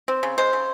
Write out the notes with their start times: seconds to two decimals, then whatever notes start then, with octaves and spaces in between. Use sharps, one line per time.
0.08 C4
0.23 C#3
0.38 G#3 C5
0.53 C#3